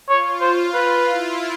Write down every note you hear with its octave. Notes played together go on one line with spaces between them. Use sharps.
F4 C#5
C5
F4 B4
E4